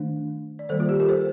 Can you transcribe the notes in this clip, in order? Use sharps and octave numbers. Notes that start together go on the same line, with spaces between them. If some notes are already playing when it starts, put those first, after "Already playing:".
Already playing: D#3 A3 D4
D5
D#3 G3 A#3 A4 C5
F4 A4
G4
G4 A#4
A4 C5